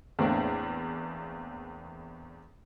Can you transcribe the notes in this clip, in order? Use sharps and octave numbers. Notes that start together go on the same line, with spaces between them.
E2 A2 A3 A#3 C4 D4